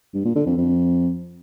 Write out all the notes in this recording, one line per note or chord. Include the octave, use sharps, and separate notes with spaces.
G2
A#2
D3
F2
F2